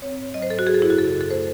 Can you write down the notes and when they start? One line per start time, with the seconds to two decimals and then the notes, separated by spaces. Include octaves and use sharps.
0.02 C4 C#5
0.18 G#2
0.34 F#3 D#5
0.42 C5
0.50 G#2 A4
0.59 F#4
0.66 F#3 G#4
0.74 A4
0.82 F#2 E4
0.90 F#4
0.98 C#3 A4
1.15 F#2
1.21 A4
1.30 A3 C5